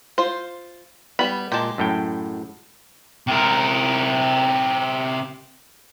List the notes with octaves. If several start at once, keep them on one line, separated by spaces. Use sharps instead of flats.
F4 C5
G3 B3 B5
A#2 G#3 G4 A5
F#2 A2 G5
C3 A#4